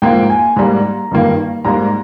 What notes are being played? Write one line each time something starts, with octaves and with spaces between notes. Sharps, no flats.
G#2 F3 A#3 G5
G#5
G#2 G3 A#3 A#5
G2 D#3 A#3
G#2 G3 A#3 A#5